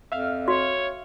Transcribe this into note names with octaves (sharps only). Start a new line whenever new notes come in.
F2 E5 F5 F6
F#4 C#5